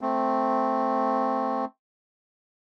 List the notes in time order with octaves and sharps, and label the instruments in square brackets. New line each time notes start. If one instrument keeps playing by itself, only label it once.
[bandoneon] A3 C4